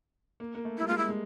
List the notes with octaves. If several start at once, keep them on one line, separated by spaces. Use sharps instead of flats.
A#3
A#3
A3
G3 E4
G#3 F4
E4
G#3